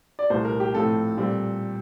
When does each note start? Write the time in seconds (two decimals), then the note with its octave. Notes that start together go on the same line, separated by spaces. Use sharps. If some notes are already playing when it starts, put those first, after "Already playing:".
0.19 D5
0.30 C2 A#2 A3 C5
0.45 A#4
0.60 G4
0.74 A2 F3 C4 A4
1.17 A#2 G3 C4